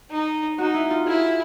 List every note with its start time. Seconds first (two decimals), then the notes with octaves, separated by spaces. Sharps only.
0.11 D#4
0.58 D#4 F#4
0.74 E4
0.90 F4
1.06 E4 G#4